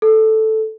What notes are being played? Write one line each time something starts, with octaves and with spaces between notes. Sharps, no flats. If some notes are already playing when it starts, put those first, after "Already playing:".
A4